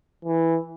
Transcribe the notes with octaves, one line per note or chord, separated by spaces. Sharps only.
E3